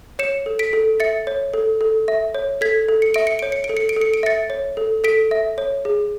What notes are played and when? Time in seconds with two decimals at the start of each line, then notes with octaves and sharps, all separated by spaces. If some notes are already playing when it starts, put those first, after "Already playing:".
0.19 C#5 C#7 E7
0.46 A4
0.59 B6 D7
0.73 A4
1.00 E5 A6 C#7
1.27 C#5
1.54 A4
1.81 A4
2.08 E5
2.35 C#5
2.61 A4 G#6 B6
2.88 A4
3.02 C#7
3.14 E5 D7
3.27 C#7
3.39 C#5 D7
3.52 C#7
3.64 D7
3.69 A4
3.77 C#7
3.89 D7
3.96 A4
4.01 C#7
4.14 D7
4.23 E5 A6 C#7
4.50 C#5
4.77 A4
5.04 A4 B6 D7
5.31 E5
5.58 C#5
5.85 G#4